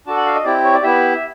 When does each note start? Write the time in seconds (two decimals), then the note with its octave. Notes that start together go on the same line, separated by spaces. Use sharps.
0.07 D4 F#4 A4 A5
0.17 F#5
0.26 F5
0.35 D#5
0.44 C4 E4 G4 D5
0.64 C#5
0.74 D5
0.83 B3 E4 G4 E5